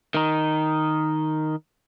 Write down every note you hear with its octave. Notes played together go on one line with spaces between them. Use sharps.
D#3 D#4